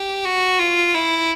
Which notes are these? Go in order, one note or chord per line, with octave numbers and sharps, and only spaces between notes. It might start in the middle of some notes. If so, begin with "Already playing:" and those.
Already playing: G4
F#4
F4
E4